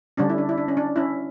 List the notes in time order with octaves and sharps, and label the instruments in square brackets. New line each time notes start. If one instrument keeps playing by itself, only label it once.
[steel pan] D3 G3 C#4 D4
E4
D4
E4
D4
C#4
D4
C#4 E4